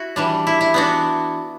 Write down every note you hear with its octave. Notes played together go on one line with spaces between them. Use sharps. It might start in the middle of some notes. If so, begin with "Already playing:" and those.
Already playing: E4 F#4
E3 G3 D4
E4
E4
E3 B3 D4 F#4